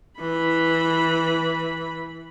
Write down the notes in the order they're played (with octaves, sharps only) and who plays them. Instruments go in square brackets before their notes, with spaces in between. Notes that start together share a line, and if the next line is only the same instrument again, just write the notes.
[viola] E3 B5